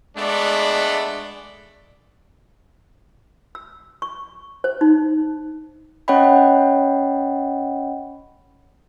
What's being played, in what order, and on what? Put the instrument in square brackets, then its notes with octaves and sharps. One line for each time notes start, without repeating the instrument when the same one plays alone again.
[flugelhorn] G#3 [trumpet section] A3 B3 D4 [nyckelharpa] D5 B5
[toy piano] E6
C#6
C5
D#4
[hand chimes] C#4 C#5 D#5 F#5 G5 B5